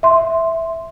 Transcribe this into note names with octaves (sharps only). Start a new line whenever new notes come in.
E5 C6